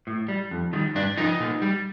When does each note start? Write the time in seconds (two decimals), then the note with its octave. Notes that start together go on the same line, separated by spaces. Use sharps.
0.07 A2
0.28 G3
0.51 F2
0.73 D#3 G3
0.95 G2 D4
1.17 F3 D#4
1.40 A#2
1.62 G3